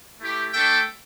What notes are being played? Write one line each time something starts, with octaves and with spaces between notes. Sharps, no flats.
A3 E4 G4
A3 D4 A4 E5 G5